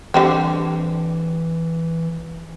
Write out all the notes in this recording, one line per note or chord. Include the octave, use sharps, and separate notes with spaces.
D3 E3 G3 C4